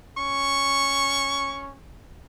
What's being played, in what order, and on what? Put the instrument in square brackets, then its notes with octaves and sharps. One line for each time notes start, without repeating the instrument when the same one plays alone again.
[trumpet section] C#4 C#6